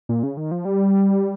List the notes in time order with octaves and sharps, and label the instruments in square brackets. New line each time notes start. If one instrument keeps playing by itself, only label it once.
[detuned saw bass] A#2
C#3
D#3
F3
G3